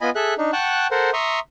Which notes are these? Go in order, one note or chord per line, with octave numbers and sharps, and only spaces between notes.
B3 F4 D#5 G#5 B5
G#4 A4 E5 F#6
D4 D#4
F#5 G5 A5 C#6 F#6
A4 A#4 C5 F#5
E5 A#5 C6 C#6 D#6